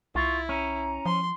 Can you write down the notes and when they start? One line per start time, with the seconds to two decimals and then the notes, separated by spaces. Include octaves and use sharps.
0.15 C2 E4 F4 C#6
0.49 C#4 A#5
1.06 F3 C6